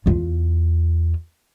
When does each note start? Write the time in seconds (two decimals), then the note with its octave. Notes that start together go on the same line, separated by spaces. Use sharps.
0.06 E2 F4